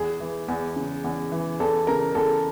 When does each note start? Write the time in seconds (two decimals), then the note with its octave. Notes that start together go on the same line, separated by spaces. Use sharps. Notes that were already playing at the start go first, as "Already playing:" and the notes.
Already playing: E2 G#4
0.20 E3
0.48 E2
0.76 C#3
1.04 E2
1.32 E3
1.60 E2 A4
1.87 C#3 A#4
2.15 E2 A4